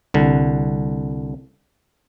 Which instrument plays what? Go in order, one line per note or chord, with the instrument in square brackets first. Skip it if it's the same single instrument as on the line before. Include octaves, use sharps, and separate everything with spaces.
[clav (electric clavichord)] C2 D3